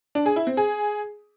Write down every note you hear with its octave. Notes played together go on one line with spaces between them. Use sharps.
D4
G#4
E4
C4
G#4